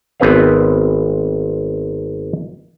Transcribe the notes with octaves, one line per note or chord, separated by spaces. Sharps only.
G#1 B3 C4 B4 C#5 F5